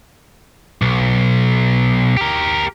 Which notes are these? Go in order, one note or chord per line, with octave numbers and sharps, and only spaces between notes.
B1
G4 A#4